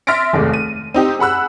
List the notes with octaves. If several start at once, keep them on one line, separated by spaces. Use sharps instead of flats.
E5 C6 F6 A6 A#6 D7
F1 D#2 G#3 D6
D#7
C4 D#4 G4
G#4 F#5 B5 E6 F#6